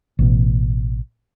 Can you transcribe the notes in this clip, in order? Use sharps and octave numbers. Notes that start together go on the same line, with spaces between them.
A1 B2